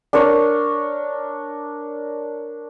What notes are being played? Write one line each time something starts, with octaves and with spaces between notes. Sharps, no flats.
D4 A#4 C#5